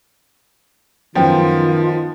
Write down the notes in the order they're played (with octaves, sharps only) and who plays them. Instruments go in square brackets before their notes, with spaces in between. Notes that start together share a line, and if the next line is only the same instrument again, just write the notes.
[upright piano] F#2 G5 [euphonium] D#3 [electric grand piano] F3 B3 [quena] F4